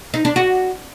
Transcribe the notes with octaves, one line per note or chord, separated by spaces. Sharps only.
D#4
D4
F#4